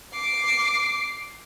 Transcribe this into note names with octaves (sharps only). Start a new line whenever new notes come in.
D6 C7